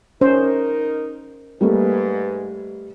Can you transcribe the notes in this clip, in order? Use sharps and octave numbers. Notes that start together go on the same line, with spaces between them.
C#4 D#4 A#4 C5
G#2 G3 A3 A#3 B4